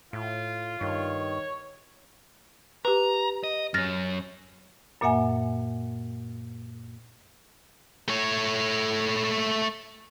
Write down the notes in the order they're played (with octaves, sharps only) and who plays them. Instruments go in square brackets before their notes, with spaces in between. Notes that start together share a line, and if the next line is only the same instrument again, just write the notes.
[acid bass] A2 [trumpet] F4
[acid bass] G2 [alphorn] D#3 [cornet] C#5
[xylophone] G4 B4 [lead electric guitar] A#5
[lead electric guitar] D#5
[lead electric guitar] F#2 C#4 [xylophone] F6 A6 A#6
[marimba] F#2 A#2 A#3 E5 F#5 G#5
[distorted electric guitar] A3 C#5